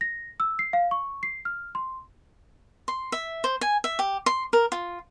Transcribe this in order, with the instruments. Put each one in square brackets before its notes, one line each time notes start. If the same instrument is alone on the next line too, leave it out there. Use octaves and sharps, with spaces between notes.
[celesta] A#6
E6
C7
F5
C#6
C7
F6
C6
[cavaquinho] C6
E5
C5
G#5
E5
G4
C6
A#4
F4